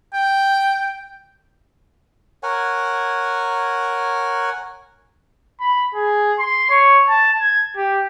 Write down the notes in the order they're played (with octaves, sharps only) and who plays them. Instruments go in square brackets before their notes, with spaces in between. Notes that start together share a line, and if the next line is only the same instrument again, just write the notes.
[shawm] G5
[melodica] A#4 C#5 F#5 G#5
[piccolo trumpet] B5
G#4
C6
C#5
A5
G#6
G4